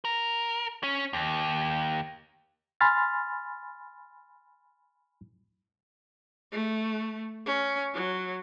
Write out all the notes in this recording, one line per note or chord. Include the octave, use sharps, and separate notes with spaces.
A#4
C#4
D#2
G#5 B5 C6 F6 A6
A3
C#4
F#3